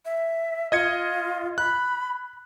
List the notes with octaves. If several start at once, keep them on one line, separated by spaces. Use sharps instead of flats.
E5
F4 D#5 G#6 C#7
B5 F#6